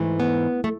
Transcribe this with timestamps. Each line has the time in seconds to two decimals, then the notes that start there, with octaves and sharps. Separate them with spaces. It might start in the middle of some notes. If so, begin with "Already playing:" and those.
Already playing: G#2 E3 A3
0.20 B3
0.64 A3